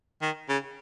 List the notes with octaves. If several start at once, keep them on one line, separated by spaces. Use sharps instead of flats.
D#3
C#3